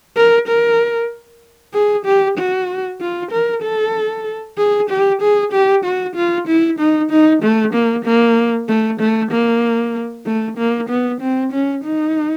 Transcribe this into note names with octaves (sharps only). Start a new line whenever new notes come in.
A#4
A#4
G#4
G4
F#4
F4
A#4
A4
G#4
G4
G#4
G4
F#4
F4
E4
D#4
D#4
A3
A#3
A#3
A3
A3
A#3
A3
A#3
B3
C4
C#4
D#4